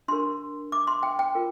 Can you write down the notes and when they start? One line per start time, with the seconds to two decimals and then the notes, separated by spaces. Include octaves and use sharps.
0.08 D4 G4 A#4 C6
0.72 D6
0.87 C6
1.03 G5
1.19 G5
1.35 F4 A#4